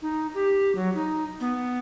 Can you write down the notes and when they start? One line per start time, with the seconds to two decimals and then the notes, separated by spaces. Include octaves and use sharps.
0.02 D#4
0.35 G4
0.75 F#3
0.95 D#4
1.40 B3